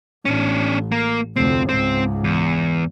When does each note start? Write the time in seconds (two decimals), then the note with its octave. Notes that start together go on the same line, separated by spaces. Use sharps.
0.25 A1 C#4 D4
0.92 A#3
1.36 F1 D2 C4
1.69 C#2 G#2 C4
2.24 E2